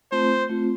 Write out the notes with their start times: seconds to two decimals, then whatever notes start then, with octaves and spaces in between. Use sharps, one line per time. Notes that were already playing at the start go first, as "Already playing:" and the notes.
0.12 A3 C4 F4 C5
0.49 A3 C4 F4